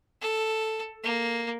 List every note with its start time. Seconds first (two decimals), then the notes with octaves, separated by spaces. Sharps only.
0.21 A4
1.04 A#3